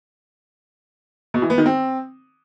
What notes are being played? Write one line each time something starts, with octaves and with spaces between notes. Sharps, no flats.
B2
E3
B3
D#3
C4